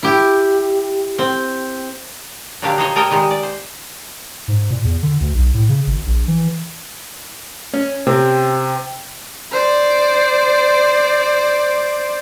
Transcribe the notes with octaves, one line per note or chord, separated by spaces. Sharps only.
E4 G4
C4
A#2 D3 F#3 D4 G4 F5
D#4 C5 C#5 D#5
A4 A#4 C#5 D#5 G5
D#3 G3 G#3 D#4
D5
C5
G#2
A#2
E2
D3
D2
B1
A2
C#3
G#1
A#1
E3
C#4
C3 C4
C5 D5